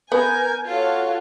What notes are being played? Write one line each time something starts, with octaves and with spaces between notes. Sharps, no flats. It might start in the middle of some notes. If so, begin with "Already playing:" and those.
B3 A#4 B4 G#5 G6
F4 F#4 A4 C#5 F5